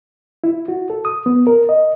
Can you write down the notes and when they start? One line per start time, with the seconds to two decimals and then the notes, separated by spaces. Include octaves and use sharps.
0.44 E4
0.68 F#4
0.90 A4
1.05 D#6
1.26 B3
1.47 A#4
1.69 D#5